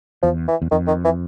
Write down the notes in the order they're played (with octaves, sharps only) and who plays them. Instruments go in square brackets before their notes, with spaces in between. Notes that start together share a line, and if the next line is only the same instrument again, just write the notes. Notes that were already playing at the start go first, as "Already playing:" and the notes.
[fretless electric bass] E2 [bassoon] F3
[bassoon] E3
[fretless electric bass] E2
[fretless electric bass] F2 [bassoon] D#3
[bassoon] D#3
E3